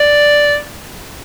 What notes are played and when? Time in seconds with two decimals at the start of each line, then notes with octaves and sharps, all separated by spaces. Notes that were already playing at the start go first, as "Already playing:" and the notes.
Already playing: D5